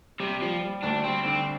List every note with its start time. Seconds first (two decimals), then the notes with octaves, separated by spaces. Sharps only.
0.20 C3 G3
0.41 F3 G3
0.62 G3
0.83 D2 D4
1.04 G3 C4
1.25 D3 C4